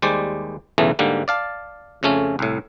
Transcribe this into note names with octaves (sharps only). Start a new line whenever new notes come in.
D#2 G3 G#3 C5 D5
B1 E2 C#3 E3 A3
G#2 D3 G3 A#3
D5 F5 A5
F2 C#3 A3 C#4
C2 A2